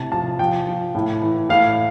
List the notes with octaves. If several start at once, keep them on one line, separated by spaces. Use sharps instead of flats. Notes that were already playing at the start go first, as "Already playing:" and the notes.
Already playing: A2 C3 A5
F3 A5
F3 G5
F3
A2
E3
A2 F5